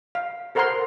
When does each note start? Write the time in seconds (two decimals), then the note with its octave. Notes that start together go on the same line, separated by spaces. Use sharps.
0.15 F5
0.55 A4 A#4 C5 F#5 A#5 C6